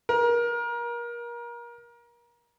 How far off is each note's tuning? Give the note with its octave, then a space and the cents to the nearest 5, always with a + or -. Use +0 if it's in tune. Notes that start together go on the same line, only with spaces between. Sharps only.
A#4 +30